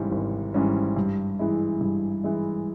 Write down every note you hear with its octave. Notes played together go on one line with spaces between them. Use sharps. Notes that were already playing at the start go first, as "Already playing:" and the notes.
Already playing: G#1 G#2 E3 G3 C#4
G#1
G#2 E3 G3 C#4
G2
E3 G#3 E4
G2
E3 G#3 E4